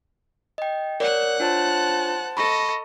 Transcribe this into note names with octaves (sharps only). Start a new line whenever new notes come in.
D#5 G5
A#4 C#5 D5 F#5 F#6
D4 F4 C5 C#5 A5
A4 D#5 B5 C#6 A#6